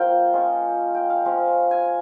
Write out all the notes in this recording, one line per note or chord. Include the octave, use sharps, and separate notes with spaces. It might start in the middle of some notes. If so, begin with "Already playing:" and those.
Already playing: F3 A#3 F4 F5 G5
G#3 C#4 F4
G5
F5
F3 G#3 C#4 F4
G#5